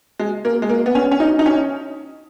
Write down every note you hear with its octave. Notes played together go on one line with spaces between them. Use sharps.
G#3
A#3
G#3
A#3
B3
C#4
C#4
D#4
D#4
C#4